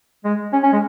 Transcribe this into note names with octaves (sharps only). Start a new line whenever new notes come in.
G#3
C#4
C#4
G#3